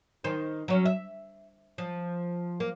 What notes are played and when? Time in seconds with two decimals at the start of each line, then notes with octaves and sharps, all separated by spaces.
0.24 D#3 C5
0.68 F#3 C#4
0.85 E5
1.78 F3
2.60 A#3